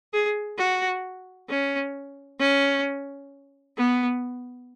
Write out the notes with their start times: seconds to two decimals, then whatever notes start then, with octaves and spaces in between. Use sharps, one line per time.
0.13 G#4
0.58 F#4
1.49 C#4
2.40 C#4
3.77 B3